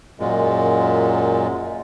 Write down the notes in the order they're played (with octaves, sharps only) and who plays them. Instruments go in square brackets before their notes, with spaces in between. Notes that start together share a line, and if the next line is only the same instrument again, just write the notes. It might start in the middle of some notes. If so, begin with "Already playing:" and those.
[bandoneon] F#2 A#2 G#3